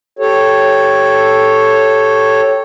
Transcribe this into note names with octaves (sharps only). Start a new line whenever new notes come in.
G4 A4 C#5